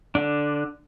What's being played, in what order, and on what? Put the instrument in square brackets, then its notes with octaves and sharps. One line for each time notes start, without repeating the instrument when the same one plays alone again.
[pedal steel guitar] D3 D4